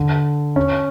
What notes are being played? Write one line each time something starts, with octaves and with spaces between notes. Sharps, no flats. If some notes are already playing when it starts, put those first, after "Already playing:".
Already playing: D3
C#4